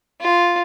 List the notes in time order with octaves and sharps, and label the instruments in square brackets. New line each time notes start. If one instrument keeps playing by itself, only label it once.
[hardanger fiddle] F4